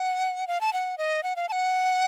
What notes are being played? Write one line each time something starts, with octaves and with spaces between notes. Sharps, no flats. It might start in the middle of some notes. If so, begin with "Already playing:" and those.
Already playing: F#5
F5
A5
F#5
D#5
F#5
F5
A5
F#5